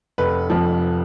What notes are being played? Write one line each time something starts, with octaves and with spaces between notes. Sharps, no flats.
F1 B4
F2 F3